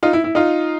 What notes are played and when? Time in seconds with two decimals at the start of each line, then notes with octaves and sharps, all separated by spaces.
0.03 D#4 F4
0.13 E4
0.24 E4
0.35 D#4 F4